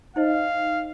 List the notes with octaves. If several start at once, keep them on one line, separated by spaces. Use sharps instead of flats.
D#4 C5 D#5 F5